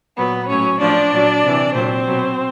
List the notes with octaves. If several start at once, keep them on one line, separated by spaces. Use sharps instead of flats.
A#2 F#3 B3 B4
A2 F#3 C#4 C#5
A2 F3 D4 D5
A#2 F#3
C3 E3
A#2 F#3 C4 C5
B2 F#3